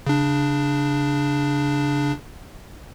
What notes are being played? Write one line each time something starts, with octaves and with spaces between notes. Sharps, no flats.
C#3 D4